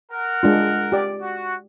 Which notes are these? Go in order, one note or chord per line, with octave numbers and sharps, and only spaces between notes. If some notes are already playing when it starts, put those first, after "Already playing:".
A#4 F#5
G#3 D4 F4
G4 D5
F#4